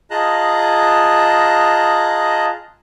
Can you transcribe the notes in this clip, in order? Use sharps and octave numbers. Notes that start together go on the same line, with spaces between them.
F4 G#4 D#5 A5 A#5 F#6